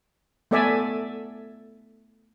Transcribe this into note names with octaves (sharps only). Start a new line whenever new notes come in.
A3 B3 A4 D5 E5 G#5